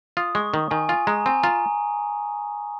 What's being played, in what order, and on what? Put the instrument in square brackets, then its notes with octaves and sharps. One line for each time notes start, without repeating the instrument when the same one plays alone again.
[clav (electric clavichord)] F4 [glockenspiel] D#6
[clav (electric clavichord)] G#3 [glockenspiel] C#6
[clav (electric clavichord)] D#3
[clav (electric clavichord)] D#3 [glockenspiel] G#5
[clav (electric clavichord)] F4 [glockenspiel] G#5
[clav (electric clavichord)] G#3 [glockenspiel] A#5
[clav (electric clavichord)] C4 [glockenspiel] G#5
[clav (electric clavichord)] F4 [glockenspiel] A#5